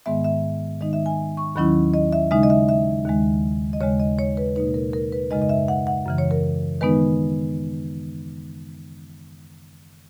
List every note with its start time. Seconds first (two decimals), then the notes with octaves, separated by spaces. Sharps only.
0.06 G#2 D#3 G#3 B3 E5
0.24 E5
0.81 D#3 G#3 D#4 D#5
0.93 E5
1.06 G#5
1.37 C#6
1.56 D#2 D#3 F#3 C#4 E4 B5
1.94 D#5
2.12 E5
2.31 C#3 G#3 D#4 E5
2.43 D#5
2.50 E5
2.69 E5
3.06 D#2 D#3 G#3
3.73 D#5
3.81 D#2 C#3 G#3 C#5
4.00 D#5
4.19 C#5
4.37 B4
4.56 B2 A#3 D#4 B4
4.74 A#4
4.93 A#4
5.13 B4
5.30 F#2 C#3 G#3 D#4 D#5
5.42 D#5
5.49 E5
5.68 F#5
5.87 F#5
6.06 F#2 C#3 E3
6.18 C#5
6.31 A#4
6.81 D#3 G#3 B3 D#4 B4